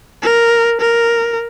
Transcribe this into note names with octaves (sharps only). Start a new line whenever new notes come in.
A#4
A#4